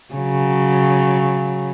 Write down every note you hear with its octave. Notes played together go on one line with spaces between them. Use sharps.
C#3 F#3